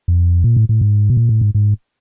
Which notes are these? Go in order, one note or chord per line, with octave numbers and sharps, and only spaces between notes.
F2
A#2
A2
A2
G#2
B2
A#2
A2
G#2
G#2